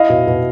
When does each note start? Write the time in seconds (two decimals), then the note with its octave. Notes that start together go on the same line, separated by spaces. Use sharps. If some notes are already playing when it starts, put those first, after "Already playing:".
Already playing: E4 D#5 F5
0.09 B2
0.27 B2